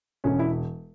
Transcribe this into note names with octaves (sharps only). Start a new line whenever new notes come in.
E1 C#4
E4